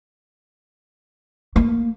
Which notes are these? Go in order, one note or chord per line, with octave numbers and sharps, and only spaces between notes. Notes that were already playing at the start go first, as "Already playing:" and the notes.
A#3